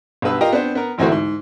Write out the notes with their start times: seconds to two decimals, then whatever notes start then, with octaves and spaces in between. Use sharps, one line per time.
0.22 B1 G2 B4 E6
0.41 F4 G4 A#4 D#5 G5
0.52 B3 C4 D4 C5
0.75 B3 A#4
0.98 A1 D2 E3 A3 C4 F#4
1.12 G#2